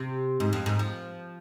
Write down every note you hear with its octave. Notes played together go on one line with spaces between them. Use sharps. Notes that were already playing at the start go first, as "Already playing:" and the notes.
Already playing: C3
G#2
F2
G#2
F3